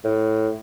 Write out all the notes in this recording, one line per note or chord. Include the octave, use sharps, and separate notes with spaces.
A2